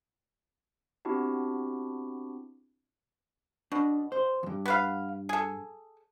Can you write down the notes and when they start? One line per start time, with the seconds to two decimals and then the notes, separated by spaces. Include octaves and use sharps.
1.05 B3 C4 D4 E4 F#4 G4
3.72 B2 D4
4.12 C5
4.43 E2 G2
4.66 B3 B4 F5
5.29 G#4 A4